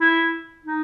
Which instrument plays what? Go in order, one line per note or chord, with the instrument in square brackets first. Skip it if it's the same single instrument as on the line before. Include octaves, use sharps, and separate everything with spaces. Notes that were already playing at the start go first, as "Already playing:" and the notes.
[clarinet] E4
D#4